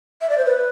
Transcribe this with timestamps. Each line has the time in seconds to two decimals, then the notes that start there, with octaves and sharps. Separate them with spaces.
0.21 E5
0.29 D5
0.38 C5
0.46 B4